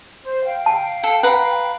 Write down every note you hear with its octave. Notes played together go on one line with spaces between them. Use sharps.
C5
F5 G5
A5
A4
B4 F#5 A#5